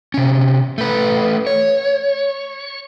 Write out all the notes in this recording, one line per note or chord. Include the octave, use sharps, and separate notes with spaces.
C3 C#4
A3 B4
C#5